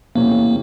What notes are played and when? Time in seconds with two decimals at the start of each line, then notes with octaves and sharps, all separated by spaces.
0.15 E2 C3 E3 A3 A#3 C#4